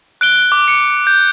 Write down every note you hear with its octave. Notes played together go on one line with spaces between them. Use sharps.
F#6 D7 G7
D6
C#7
G6